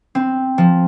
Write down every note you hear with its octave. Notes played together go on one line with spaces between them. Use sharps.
C4
F3